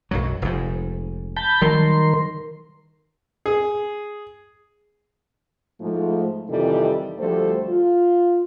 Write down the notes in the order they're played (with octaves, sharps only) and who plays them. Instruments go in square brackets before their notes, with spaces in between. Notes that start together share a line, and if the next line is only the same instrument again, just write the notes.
[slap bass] B1 F#2 F#3
F1 G#2
[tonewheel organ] A5 B5 G6
[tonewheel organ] D#3 A#4 C6 [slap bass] F#3 G3
[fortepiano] G#4
[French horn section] G#2 F3 A3
F2 C3 D#3 E3 G3 A4
D2 F3 G3 A3 A4 C5
F4